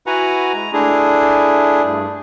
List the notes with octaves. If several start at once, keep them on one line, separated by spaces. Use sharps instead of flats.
E4 F#4 B4 F#5 G#5 A#5
G#3 A#5
A3 D4 E4 G#4
G2